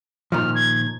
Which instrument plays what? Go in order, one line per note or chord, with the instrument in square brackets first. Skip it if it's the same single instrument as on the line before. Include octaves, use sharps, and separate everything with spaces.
[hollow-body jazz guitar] A#2 D#3 F3 [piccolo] F6
[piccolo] G#6